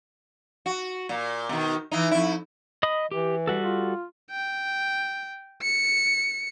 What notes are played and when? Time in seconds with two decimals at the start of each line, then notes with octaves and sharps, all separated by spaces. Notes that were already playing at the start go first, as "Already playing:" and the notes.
0.66 F#4
1.09 A#2
1.49 B2 D#3
1.91 E3 D#4
2.11 F2 E4
2.83 D#5 B5 D#6
3.11 E3 G4
3.47 G3 F#4 A4
3.63 F4
4.31 G5
5.62 C#7